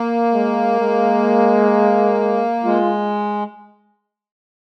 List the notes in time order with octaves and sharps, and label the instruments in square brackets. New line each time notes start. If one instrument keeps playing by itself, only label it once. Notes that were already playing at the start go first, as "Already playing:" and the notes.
Already playing: [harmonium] A#3
[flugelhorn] G#3
G#3
[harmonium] G#3 [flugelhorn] F4